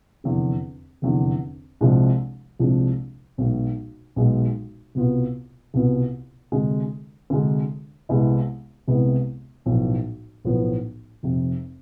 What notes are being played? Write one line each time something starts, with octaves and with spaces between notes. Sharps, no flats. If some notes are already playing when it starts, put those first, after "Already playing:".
F1 E2 D3
F1 E2 D3
C2 C3 F3 G#3 D4
C2 C3 F3 G#3 D4
B1 B2 G#3
B1 B2 G#3
C2 B2 B3 F4
C2 B2 B3 F4
D2 C3 G#3
D2 C3 G#3
C2 C3 G#3 B3 E4
C2 C3 G#3 B3 E4
B1 A2 F3 B3
B1 A2 F3 B3
F1 F2 C3